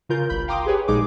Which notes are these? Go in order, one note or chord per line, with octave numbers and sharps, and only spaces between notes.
C#3 F4 A#4 G6
G1 C2 B5 G6
F5 G5 A#5 C6 D6 D#6
G4 G#4 B4 C#5
A#1 A#2 G#3 D#4 G#4 D6